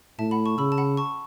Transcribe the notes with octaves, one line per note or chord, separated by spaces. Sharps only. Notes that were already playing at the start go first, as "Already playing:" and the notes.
A2 E5 A5
F#5 B5
A5 C#6
C#3 B5 E6
A5
F#5 B5
A5 C#6